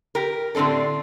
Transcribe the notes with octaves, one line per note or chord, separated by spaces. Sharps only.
G4 A#4
A2 D3 C4 D4 A4